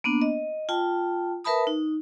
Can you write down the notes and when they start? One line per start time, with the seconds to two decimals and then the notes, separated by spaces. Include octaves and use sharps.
0.04 A#3 B3 D4
0.22 D#5
0.69 F4 G5 A5
1.44 A#4 B4 E5 A5 B5 D#6
1.67 D#4